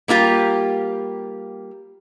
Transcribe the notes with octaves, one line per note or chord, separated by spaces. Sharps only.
G3 A#3 F4 G4